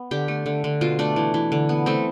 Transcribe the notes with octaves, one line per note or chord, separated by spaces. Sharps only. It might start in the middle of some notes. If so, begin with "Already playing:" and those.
Already playing: B3
D3 G4
A3
D3
D3
B2 F4
A3 D4
E3
E3
D3
B3
A3 C4